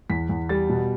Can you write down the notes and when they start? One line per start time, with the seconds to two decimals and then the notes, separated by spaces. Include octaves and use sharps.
0.10 E2 B6
0.29 E2
0.49 G3 A6
0.69 B2